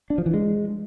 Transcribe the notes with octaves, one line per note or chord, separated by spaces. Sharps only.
D4
F3
E3
G#3